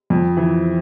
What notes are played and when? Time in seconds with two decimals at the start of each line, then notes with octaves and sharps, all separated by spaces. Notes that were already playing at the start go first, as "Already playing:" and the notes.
0.10 F2
0.37 E3